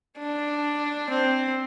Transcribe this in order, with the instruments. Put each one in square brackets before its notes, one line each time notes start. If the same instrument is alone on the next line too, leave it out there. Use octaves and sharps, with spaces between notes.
[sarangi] D4
C4